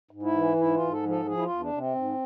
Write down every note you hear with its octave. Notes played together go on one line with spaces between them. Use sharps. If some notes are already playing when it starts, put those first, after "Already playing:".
G#2
E4
E3
G#2 E4
F4
G#2
A4
F3
A4
F3 G#4
E4
F4
E2
D4
C3
C4
G#2